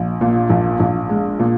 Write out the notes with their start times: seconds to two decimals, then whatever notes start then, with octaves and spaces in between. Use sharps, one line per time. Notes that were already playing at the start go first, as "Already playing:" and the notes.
Already playing: A#1
0.21 A#2
0.50 A#1
0.80 A#1
1.09 G#3
1.39 A#2